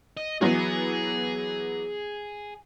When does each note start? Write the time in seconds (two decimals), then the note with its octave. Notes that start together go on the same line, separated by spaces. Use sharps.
0.17 D#5
0.41 E3 F#3 B3 G#4